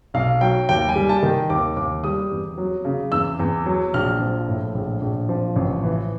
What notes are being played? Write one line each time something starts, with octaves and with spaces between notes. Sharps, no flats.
B1 F5
F#3 G5
D#2 G5
G#5
G3
A5
D#3
D#2 D6
D#2 D6
G3 D#6
E2
F#3
C#3
E2 E6
E2
F#3
A#1 F6
F3
A2
A#1
A#1
F3
A1
E3